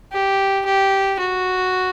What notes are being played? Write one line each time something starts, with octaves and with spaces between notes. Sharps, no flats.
G4
G4
F#4